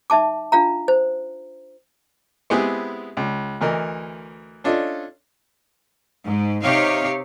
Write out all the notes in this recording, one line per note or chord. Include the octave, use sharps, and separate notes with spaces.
D#4 E5 A5 D6
D4 F4 F5 A#5
C5
G#3 B3 C4 E4 G4 G#4
C#2
D2 E3 A#4 D#5
C#4 D4 F4 A4 D#5
G#2
C3 D#4 G4 C#5 F5